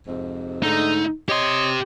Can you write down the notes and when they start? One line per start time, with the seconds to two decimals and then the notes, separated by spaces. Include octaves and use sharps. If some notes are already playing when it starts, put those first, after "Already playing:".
0.07 F2 G#2 C3
0.63 G#2 D3 A3 D#4
1.29 G4 C#5 D#5 C6